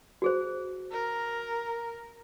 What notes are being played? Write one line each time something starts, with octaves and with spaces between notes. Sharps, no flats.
F#4 G#4 C5
A#4